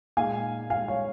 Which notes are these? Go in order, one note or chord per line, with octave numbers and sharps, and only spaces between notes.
A#2 G#3 D#4 F5 G#5
F5 G#5
C#5 F5